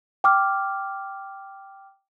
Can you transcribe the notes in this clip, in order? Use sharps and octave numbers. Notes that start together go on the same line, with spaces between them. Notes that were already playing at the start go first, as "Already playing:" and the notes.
G5 D6 F6